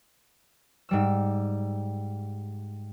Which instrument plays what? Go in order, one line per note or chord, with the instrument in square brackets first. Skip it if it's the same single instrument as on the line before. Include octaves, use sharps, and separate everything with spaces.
[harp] G#2 G3 E6